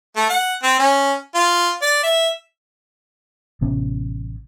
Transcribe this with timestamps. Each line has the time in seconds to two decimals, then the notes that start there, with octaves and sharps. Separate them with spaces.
0.16 A3
0.30 F#5
0.63 C4
0.79 C#4
1.35 F4
1.82 D5
2.03 E5
3.61 A1 C3 B3 C#4